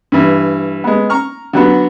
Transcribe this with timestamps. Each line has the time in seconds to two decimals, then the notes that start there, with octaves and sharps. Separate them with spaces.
0.12 G2 E3
0.84 G#3 B3
1.10 A#5 C#6 F6
1.53 D3 F#3 B3